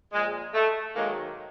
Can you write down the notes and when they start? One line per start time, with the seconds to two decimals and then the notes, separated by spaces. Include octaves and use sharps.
0.13 A#2 F3 G#3
0.54 A3
0.95 G#2 D#3 F#3 G#3 A#3